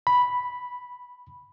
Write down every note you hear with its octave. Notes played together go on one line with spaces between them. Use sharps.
B5